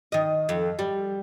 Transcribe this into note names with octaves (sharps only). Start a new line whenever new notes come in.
D#3 D#5
F2
G3